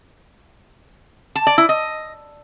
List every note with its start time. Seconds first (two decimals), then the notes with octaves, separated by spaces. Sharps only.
1.35 A5
1.47 D5
1.58 E4
1.69 D#5